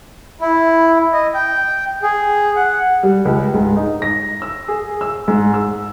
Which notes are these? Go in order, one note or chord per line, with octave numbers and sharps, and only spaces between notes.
E4
D#5
G5
G#4
F#5
G3
C#2
G#2
D#4
A#6
E6
G#4
E6
G#2
E6